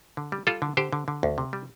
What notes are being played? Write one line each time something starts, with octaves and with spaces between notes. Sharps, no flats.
D3
G3
G3 F4 A4
D3
D3 G4 C5
D3
D3
D2
C3
G3